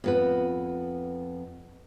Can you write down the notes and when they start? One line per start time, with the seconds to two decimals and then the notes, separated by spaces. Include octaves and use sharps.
0.04 F2 B3 B4